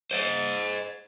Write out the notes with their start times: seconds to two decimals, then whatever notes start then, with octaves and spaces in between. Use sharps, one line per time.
0.11 C5 D#5